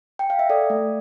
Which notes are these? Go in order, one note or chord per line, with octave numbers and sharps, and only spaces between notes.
G5
F5
E5
A4 D5
A3